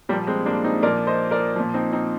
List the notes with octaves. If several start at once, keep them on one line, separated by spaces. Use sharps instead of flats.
A#2 F3 G3 A#3
G#3 C4
A#3 D4
C4 D#4
A#2 F3 A#4 D5
C5 D#5
A#4 D5
A#2 F3
C4 D#4
C4 D#4